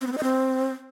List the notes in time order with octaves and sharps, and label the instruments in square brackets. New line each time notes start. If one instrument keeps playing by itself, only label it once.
[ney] C4
B3
C4
D#5
C4